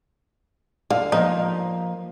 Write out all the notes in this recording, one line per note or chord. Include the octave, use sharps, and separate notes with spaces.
D3 F5
F3 A#3 D#4